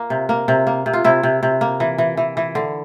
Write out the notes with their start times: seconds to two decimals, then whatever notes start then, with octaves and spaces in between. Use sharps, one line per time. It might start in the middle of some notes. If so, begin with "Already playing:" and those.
Already playing: A#3
0.10 C3
0.29 A#3
0.48 C3
0.67 A#3
0.86 C3
0.93 F4
1.04 C3 E4
1.23 C3
1.43 C3
1.61 A#3
1.80 E3
1.98 E3
2.17 E3
2.37 E3
2.55 D3